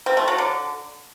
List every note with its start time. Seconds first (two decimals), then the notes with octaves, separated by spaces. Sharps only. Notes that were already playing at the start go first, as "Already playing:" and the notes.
0.06 C4
0.17 A3
0.28 F#3
0.38 D3